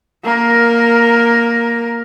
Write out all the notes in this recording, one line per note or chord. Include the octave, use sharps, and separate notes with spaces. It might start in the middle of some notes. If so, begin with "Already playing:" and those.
A#3 A#4